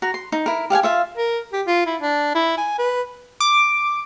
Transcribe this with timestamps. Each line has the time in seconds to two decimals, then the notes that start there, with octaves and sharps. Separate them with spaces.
0.02 F#4 A#5
0.14 C6
0.32 D#4
0.46 E4 A#4
0.70 G4 F5 F#5 G#5
0.83 F4 E5 F5
1.17 A#4
1.53 G4
1.67 F4
1.86 E4
2.01 D4
2.35 E4
2.58 G#5
2.79 B4
3.40 D6